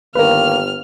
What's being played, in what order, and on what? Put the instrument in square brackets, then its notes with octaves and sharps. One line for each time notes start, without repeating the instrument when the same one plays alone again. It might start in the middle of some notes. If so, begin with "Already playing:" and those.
[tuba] G1 [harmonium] D#3 A#3 [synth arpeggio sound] A#4 B4 [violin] F6